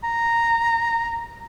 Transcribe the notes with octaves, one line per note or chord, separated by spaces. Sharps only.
A#5